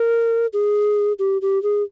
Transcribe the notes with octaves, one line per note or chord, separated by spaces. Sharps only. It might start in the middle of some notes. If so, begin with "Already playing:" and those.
Already playing: A#4
G#4
G4
G4
G#4